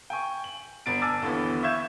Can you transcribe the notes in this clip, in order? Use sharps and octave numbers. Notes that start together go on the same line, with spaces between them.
G5 G#5 C#6
F#7
G1 B3 A6 D7
G#5 A5 D6 E6 F6 A6
D#2 D3 E3 B3
E5 F5 C#6 G6 G#6 E7